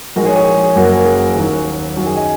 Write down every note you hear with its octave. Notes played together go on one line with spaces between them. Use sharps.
A#1 G#2 G#3 F#4 A#4
G#4 C#5
G#4 C#5
F#1 F#2 F#3 A#3 F#4 A#4
F#4 A#4
G#4
D#2 D#3 F#3 A#3 F#4
F#2 D#3 F#3 F#4
G#4
D#5 G#5